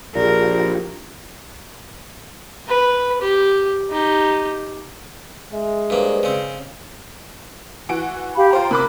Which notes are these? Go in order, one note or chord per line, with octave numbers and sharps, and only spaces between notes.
A#1 F4 G4 G#4 A#4 D5
B4
G4
D#4 G4
G#3 E5
G2 A#3 B4 C5 D5
C#3 C4
E3 F#4 D7
G4 F5 B5
F4 C5 G5 A#5
C3 A#4 B5 D6 F#6